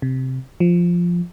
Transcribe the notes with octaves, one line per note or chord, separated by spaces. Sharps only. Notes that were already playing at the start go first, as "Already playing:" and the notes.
C3
F3